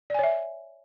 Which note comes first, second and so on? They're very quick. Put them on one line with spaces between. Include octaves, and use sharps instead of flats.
D5 G#5 C#5 E5